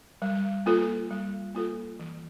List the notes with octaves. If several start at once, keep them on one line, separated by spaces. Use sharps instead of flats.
G3
A#3 F4 A4
G3
A#3 F4 A4
E3